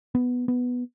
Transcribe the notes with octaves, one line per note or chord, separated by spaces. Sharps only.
B3
B3